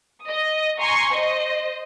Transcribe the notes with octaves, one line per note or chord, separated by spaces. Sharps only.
D#5 D#6
G#5 A#5 C6 C#6
C5 D#5